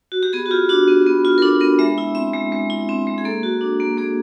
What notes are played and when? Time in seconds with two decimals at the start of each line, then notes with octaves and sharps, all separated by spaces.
0.12 F#4
0.23 G4
0.33 B3 G#4
0.46 F#4
0.51 F4 G4
0.69 D4 F#4
0.88 B3
1.06 B3
1.25 F4
1.38 A#4
1.42 D4 A4
1.60 B3 A#4
1.79 G#3 E5
1.98 E4
2.15 C4 E5
2.34 G#3
2.52 G#3
2.70 E4
2.89 C4
3.07 G#3
3.18 G#4
3.25 A#3 A4
3.43 F#4
3.61 D4
3.80 A#3
3.98 A#3 G#4